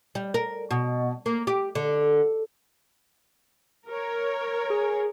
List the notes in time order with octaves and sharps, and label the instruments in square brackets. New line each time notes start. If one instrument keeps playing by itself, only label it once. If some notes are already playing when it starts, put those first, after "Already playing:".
[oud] G3
A#4
B2
A#3
G4
D3
[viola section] A#4 C#5
[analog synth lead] G#4